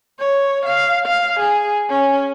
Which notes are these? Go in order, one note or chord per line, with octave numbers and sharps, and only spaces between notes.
C#5
F5
F5
G#4
C#4